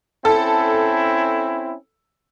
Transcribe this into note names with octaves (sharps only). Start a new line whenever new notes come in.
C4 C#4 E4 A4